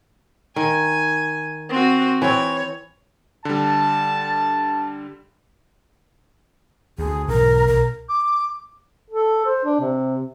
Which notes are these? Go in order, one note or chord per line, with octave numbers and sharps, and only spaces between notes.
D#3 G#5
C4 F#4
E3 C4 C#5
D3 G3 A5
D2 G#4
B1 G#2 E3 A#4
B1 A#4
D6
A4
C5
D4
C3